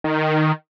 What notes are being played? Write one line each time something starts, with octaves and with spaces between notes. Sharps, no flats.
D#3